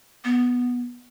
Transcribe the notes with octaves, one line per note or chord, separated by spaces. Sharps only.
B3